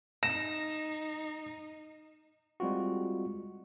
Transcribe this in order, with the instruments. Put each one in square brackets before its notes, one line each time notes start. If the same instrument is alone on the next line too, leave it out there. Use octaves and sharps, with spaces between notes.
[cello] D#4 [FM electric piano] A#6 [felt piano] E7
[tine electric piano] G3 G#3 C4 F4 F#4